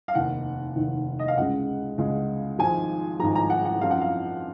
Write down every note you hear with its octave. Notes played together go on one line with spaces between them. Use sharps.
F5
F1 D#2 D#3 F#5
F1 D#2 D#3
D#5
F5
C#2 C#3 G#3 F#5
C#2 C#3 G#3
G#1 G#2 F3 G#5
G#1 G#2 F3 A#5
A#5
F#5
F#5
F#2 F3 C4 F5
F#5
F5